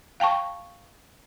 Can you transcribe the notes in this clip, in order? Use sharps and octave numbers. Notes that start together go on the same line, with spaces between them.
F5 G5 A5 C#6